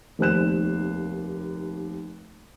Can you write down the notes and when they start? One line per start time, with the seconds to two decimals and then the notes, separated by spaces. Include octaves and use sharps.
0.19 F1 D#2 C5 F#6 E7